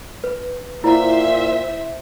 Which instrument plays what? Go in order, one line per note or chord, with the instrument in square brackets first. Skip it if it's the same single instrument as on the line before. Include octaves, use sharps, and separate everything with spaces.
[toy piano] B4
[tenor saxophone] A#2 [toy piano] E4 [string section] C5 E5